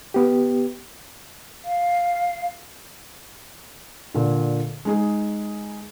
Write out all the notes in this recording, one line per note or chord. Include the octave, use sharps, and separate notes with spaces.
B3 G4
F5
A#2 D3
G#3 D#4 G#4